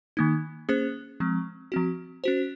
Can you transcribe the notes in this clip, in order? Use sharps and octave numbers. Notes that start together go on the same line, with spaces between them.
D#3 A#3 D#4
A#3 C#4 G#4 C5
F3 G#3 C4
F3 C4 F#4
C#4 F#4 C5